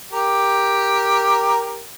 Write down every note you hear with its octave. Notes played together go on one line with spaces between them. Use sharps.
G4 A#4